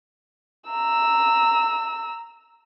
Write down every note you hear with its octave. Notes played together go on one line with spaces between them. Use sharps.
A#5 E6